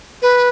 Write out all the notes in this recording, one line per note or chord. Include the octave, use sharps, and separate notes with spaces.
B4